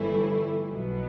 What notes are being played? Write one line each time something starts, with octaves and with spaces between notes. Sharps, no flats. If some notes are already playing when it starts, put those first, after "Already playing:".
Already playing: G1 G2 E3 A3 E4
B1 B2 F#3 B3